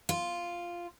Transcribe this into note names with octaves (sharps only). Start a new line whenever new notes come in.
F4